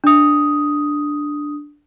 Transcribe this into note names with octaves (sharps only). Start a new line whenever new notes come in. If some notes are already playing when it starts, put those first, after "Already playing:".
D4 D#6